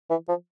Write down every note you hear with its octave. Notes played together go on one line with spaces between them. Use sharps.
E3
F3